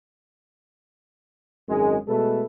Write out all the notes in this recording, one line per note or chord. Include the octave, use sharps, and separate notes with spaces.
G#1 F#2 G#3
B2 G#3 A3 A4 B4